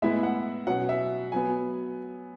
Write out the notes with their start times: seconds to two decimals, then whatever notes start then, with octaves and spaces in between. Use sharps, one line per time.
0.02 A2 G#3 B3 E4 E5
0.23 F#5
0.67 B2 F#3 C#4 F#5
0.89 E5
1.32 F#3 B3 G#5